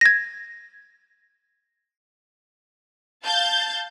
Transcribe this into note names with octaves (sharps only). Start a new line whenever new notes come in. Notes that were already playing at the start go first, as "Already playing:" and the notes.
G#6 A#6
F5 A5 G6 A6